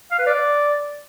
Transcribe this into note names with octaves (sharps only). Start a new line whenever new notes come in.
F5
B4
D5